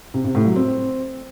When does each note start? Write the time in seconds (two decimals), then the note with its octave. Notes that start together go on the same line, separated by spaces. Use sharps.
0.14 C3
0.24 C3
0.35 A2
0.45 F#3
0.56 C4